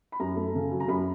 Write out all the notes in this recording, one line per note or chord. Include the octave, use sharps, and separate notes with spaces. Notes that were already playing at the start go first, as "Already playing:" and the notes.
B5
F#2 A#5
A3
C#3
F#3
A#5
F#2 B5